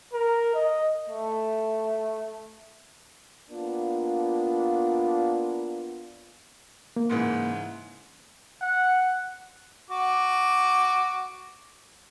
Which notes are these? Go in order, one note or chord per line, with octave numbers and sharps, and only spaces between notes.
A#4
D#5
A3
A#3 B3 D4 F4
A#3
G#2 C#3 E3
F#5
F#4 D6